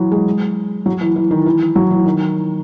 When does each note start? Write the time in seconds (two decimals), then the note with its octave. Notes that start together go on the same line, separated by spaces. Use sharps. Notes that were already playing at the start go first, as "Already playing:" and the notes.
Already playing: E3 F#3
0.11 G#3
0.86 F#3
1.01 E3
1.16 E3
1.31 D#3
1.46 E3
1.76 F#3
1.91 E3
2.06 D#3